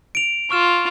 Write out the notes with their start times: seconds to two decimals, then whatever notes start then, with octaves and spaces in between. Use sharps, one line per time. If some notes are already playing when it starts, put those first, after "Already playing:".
0.15 D7 F7
0.51 F4 C#6 F6 E7